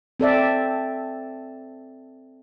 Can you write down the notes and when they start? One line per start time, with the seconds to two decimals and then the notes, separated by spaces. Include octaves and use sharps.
0.20 C4 A4 D5 E5